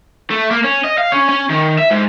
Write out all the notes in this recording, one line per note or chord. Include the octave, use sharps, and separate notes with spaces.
A3
A#3
C#4
D#5
F5
C#4
C#4
D#3
E5
G#2